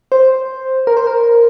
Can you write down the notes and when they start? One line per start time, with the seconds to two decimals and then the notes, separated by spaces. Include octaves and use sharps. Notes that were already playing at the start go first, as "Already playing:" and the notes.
0.12 C5
0.87 A#4
0.97 C5
1.07 A#4